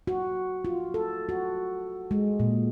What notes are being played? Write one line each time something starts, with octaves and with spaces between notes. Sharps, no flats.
F#4
F4
A4
F#4
G#3
A#2